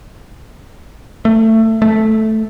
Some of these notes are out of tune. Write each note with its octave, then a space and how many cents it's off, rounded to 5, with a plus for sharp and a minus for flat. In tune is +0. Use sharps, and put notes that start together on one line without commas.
A3 +20
A3 -5